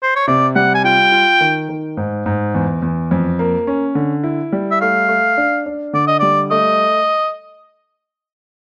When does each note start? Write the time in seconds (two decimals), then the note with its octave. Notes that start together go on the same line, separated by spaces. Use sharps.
0.03 C5
0.15 C#5
0.28 C3 D5
0.55 G3 F#5
0.74 G#5
0.84 F4 G5
1.12 F4
1.41 D#3
1.69 D#3
1.97 G#2
2.26 G#2
2.54 E2
2.82 E2
3.11 F2
3.39 A#3
3.67 C#4
3.95 D3
4.24 E4
4.52 G3
4.71 E5
4.81 A3 F5
5.08 A3
5.37 D4
5.66 D4
5.93 D3 D5
6.07 D#5
6.19 G3 D5
6.51 A3 D#5